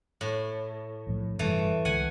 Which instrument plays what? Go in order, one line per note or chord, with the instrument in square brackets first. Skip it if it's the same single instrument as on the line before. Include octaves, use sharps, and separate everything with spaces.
[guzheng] A2
[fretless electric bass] B1 A2 F3
[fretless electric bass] F1 G2 G3 [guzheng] E3 A3
[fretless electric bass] C2 D3 G#3 [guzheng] F#5 G#5